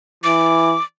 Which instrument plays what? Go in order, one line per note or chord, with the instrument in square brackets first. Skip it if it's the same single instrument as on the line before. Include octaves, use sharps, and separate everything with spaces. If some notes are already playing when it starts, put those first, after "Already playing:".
[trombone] E3 [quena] D6